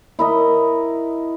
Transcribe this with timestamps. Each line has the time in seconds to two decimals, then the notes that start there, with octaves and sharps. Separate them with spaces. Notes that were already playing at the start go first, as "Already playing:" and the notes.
0.19 E4 A#4 D#5